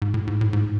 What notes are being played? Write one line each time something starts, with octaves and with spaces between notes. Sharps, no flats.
G#2
A2
G#2
A2
G#2